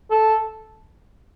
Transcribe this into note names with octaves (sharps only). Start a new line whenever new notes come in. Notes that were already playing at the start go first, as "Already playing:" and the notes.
A4